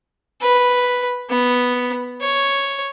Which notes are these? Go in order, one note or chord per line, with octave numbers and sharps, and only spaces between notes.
B4
B3
C#5